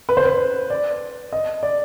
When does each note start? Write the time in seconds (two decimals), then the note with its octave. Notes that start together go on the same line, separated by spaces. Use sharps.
0.09 B4
0.17 C5
0.25 B4
0.70 D5
1.33 D#5
1.63 D5